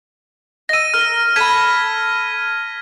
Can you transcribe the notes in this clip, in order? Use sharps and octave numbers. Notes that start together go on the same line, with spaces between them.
D#5 E6 A#6 D#7
A#4 F6
A4 B5 G#6 B6 D#7